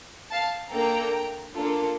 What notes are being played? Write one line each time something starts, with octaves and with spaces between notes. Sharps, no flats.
F5 A5
A#3 D4 A4 G5 A#5
A#3 D4 F4 A4